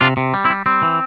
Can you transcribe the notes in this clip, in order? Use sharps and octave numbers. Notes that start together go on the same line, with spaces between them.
C3 D4 F4
C3
G3
C4 E4
G3
G3 C4
E3